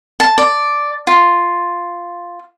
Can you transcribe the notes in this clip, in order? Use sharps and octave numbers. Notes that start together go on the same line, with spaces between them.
A5
D5
F4